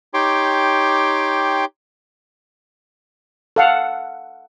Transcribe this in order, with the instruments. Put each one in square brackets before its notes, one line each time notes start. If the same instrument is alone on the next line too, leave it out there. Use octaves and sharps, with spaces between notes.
[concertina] D#4 G4 C#5 G5 C6 D6
[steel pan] A4 F5 F#5